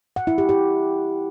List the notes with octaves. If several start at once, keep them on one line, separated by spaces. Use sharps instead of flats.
F#5
E4
G4
G4